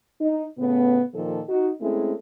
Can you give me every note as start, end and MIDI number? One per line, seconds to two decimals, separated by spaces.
0.21 0.44 63
0.58 1.02 45
0.58 1.02 49
0.58 1.02 59
1.14 1.40 46
1.14 1.40 51
1.14 1.40 53
1.14 1.40 69
1.49 1.71 63
1.49 1.71 66
1.81 2.13 56
1.81 2.13 57
1.81 2.13 60
1.81 2.13 61
1.81 2.13 64